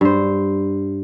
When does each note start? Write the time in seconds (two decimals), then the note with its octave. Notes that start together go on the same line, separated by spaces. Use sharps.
0.01 G2 C5